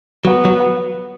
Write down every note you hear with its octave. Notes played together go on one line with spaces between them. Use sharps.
F#3 B3
F#3